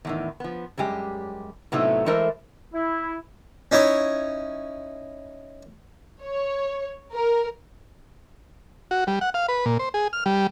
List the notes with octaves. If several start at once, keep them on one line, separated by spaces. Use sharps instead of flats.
E2 A2 D#3
F3 B3
F#2 G3 G#3 G4
A2 C3 F#3 A3 B3 D#4
E3 G#3 A3 A4 A#4 C5
E4
C#4 D#4 E4 C#5
C#5
A#4
F#4
G3
F#5
F5
B4
A#2
C5
G#4
F6
G3